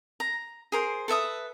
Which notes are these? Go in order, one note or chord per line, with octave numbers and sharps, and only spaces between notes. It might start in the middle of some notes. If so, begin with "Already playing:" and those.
A#5
G#4 A#4 C5
A4 B4 E5 D#6